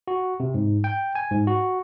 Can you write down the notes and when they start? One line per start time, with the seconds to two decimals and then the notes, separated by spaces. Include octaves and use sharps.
0.08 F#4
0.40 C3
0.54 G#2
0.84 G5
1.15 G#5
1.31 G#2
1.47 F#4